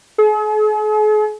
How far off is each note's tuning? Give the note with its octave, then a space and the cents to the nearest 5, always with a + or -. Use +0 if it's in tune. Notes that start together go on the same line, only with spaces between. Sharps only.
G#4 +45